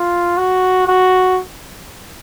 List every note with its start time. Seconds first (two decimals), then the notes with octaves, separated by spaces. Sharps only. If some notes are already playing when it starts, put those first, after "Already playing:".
Already playing: F4
0.37 F#4
0.88 F#4